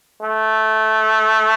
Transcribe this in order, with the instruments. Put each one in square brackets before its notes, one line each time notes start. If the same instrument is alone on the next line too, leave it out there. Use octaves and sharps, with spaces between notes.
[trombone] A3